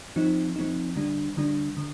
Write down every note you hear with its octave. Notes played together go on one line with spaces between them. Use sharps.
F3 C4 D#4
F3 C4 D#4
D3 G3 D4
D3 G3 D4
D3